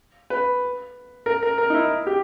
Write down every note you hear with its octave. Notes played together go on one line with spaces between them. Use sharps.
B4
A#4
A#4
A#4
D#4
E4
G4